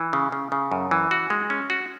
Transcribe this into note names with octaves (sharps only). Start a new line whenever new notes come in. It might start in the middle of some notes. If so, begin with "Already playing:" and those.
Already playing: E3
C#3
C#3
C#3
F#2
E3
F#4
G#3
C#4
F#4